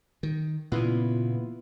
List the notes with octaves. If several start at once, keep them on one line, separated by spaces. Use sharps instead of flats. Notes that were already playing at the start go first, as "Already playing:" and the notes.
D#3
A#2 C#3 E3 B3 E4 F4